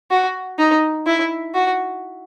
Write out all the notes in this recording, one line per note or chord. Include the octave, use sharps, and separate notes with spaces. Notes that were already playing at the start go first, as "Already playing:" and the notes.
F#4
D#4
E4
F#4